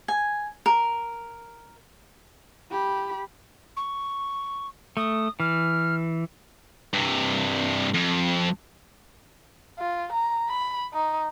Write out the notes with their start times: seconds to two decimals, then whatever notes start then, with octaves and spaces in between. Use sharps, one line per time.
0.08 G#5
0.66 A#4
2.71 G4 B5
3.76 C#6
4.97 A3 D#6
5.40 E3 F6
6.93 G2 C3
7.94 F2
9.79 F4
10.13 A#5
10.49 B5
10.94 D#4